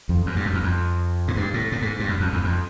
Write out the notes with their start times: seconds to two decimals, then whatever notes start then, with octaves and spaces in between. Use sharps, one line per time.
0.09 F2
0.26 F#2
0.36 G2
0.46 F#2
0.54 E2
0.64 F2
1.28 G#2
1.36 G2
1.54 A2
1.72 A2
1.82 G#2
2.00 G2
2.09 F#2
2.20 F2
2.33 E2
2.44 F2